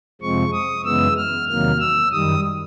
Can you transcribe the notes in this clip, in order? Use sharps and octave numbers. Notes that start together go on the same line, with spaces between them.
F2 C3 F3 G#3 C4 C#6
D#6
F#2 C#3 E3 G#3 B3 E6
F6
E2 C3 D#3 F#3 A#3 F6
E6
F#2 D#3 G3 D#6